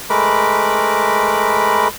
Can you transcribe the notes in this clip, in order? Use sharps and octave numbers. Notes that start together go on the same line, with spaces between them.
G#3 A3 A#4 B4 B5 D6